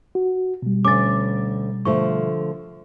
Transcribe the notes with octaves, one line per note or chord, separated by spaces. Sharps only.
F#4
B2 G3
D2 D3 C#4 D6 A6
D3 F3 A3 C#6